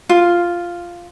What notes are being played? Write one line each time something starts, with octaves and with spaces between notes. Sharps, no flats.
F4